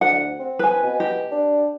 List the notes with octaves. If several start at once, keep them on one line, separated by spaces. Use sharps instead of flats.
D2 F#5
C4
B4 G#5
B2
G4
D4